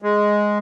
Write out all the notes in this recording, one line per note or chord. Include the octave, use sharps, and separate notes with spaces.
G#3